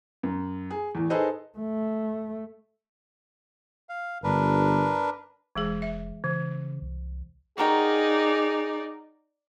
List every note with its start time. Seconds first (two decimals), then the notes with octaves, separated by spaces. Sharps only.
0.23 F#2
0.70 G#4
0.95 E2 A2
1.10 D#4 G#4 A4 B4 C5 D#5
1.58 A3
3.89 F5
4.24 G1 D4 A#4 B4
5.56 F1 E3 G#3 G#4
5.82 E5
6.24 C#3 E3
6.82 C2
7.58 D#4 F#4 G#4 A#4 D5 G5